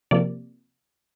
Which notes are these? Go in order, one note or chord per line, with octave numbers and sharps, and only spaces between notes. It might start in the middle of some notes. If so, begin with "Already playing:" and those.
C3 F3 A#3 D5